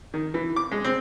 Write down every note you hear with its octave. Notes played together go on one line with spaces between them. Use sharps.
D#3
E3
D6
G#3
C4